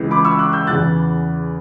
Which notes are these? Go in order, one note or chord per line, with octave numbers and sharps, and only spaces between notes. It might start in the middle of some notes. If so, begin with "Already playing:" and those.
Already playing: C#2 C#3 E3
B5 D6
C#6 E6
D6 F#6
E6 G6
E2 C#3 E3 F#6 A6